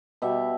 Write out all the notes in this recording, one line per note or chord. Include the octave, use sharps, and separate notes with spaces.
B2 G3 E5